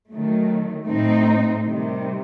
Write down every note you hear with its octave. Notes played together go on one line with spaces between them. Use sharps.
D#3 F#3 A3
A2 A3 C4 D#4
C3 D#3 G3